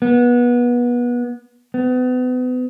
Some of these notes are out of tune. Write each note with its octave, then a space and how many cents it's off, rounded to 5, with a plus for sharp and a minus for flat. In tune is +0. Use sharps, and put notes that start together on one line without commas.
B3 -25
B3 +35